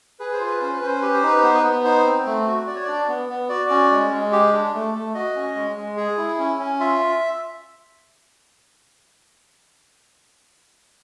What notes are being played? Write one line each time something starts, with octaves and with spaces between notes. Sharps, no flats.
G#4 B4
C5
F4
B4
C#4 C5
B4
C#4 C5
G4 B4
C5
D#4 B4
B3 C5
B4
B3
D#4 C5
C4
A3
F#4
F#4 D5
C#5
D4 D5
B3
B3
F#4 D5
C#4
G#3
G#3
G4
D4
A3
A3
F#4 D#5
C#4
G#3
G#3
G#4
E4
C#4
C#4
F4 E5